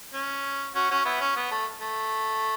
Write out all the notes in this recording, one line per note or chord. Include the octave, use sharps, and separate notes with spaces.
C#4
C#4 F#4
C#4 F#4
B3 E4
C#4
B3
A3
A3